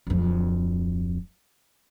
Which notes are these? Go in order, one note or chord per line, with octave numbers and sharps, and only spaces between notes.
D1 F2